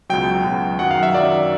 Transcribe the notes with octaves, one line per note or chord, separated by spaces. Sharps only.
C#2 B2 F#3 G5
C#2 B2 F#3
F#2 D#3 F#3 F#5
F5
E5
F#2 D#3 F#3 D5